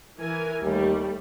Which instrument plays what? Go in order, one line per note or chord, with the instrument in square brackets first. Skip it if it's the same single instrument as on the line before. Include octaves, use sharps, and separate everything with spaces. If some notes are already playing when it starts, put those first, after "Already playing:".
[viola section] E3 A#4 G#5
[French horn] D#2 [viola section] G3 A3